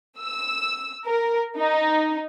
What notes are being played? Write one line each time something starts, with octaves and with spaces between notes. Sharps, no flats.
E6
A#4
D#4